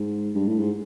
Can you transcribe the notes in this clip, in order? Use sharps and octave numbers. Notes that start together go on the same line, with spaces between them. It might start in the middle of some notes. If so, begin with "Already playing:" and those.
Already playing: G#2
G2
A2
G#2